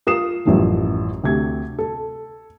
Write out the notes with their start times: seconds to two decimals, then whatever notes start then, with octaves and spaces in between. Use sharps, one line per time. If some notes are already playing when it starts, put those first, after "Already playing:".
0.07 F4 A#4 D#6 C7 E7
0.45 A1 F#2 E3 F3 G3
1.23 D2 C3 G#6
1.79 A4